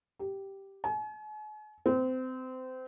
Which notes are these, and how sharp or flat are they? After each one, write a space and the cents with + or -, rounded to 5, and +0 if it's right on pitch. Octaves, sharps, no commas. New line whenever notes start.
G4 -5
G#5 +45
C4 -25